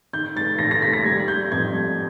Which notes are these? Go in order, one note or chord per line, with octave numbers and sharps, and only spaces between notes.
D#3 G6
F1 A6
D#2 A#6
A#6
F1 B6
A#6
G3 G#6
G3 G6
F2 G#6
G3